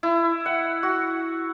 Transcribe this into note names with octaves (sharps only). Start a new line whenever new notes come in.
E4
F#5
F#4